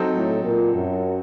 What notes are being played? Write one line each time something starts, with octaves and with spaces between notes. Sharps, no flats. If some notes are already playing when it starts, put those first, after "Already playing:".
Already playing: F#3 C4 D#4 A4
A2
A#2
F#2